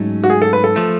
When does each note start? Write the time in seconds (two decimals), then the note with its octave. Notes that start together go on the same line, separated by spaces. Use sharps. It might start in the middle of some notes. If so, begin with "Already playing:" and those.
Already playing: G#2 F#3 A3 C#4
0.24 F#4
0.30 G#4
0.42 A4
0.53 B4
0.64 A4
0.76 F3 A3